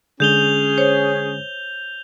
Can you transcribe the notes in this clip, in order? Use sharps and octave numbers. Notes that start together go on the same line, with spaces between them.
D3 G#3 C#4 G#4 G6 F7 G7
C5 C#5